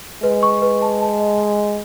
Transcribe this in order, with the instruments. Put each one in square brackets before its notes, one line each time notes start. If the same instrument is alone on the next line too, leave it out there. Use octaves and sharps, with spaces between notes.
[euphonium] G#3 [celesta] B4
[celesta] C#6
B4
A5
A5
D#5